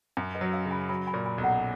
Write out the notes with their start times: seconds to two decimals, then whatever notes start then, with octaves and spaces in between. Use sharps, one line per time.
0.17 F#2
0.35 B4 D#5
0.41 F#3
0.53 C#5 F5
0.66 C#3
0.71 G#5 B5
0.89 F#3 G#5 B5
1.07 G#5 B5
1.14 A#2
1.26 G#5 B5
1.38 B1
1.44 F#5 A#5